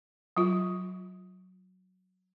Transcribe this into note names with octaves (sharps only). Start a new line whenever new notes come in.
F#3 F4